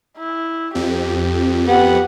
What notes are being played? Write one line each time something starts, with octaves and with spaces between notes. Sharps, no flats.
E4
F2 G4
B3 G4 F#5